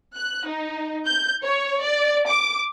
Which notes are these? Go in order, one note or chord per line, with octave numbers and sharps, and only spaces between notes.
F#6
D#4
G6
C#5
D5
D6